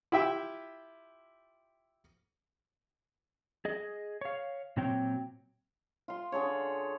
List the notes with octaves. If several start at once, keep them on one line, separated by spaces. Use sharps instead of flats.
E4 F4 G4 E5 G5
G#4 D#5
C#5 F5
A#2 F#3 C4 C#5 G5
F4 C6
D3 G#4 A4 C#5